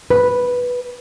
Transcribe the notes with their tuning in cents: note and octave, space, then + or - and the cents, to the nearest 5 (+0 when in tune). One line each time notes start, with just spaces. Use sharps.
B4 -5